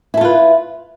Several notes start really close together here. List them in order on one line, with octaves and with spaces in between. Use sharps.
E4 A4 F4 B4